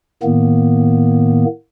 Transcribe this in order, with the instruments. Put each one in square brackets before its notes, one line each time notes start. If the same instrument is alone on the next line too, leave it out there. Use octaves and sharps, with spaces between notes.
[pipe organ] A2 D#3 A#3 B3